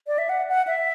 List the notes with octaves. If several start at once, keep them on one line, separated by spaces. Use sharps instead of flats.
D5
E5
F#5
F#5
E5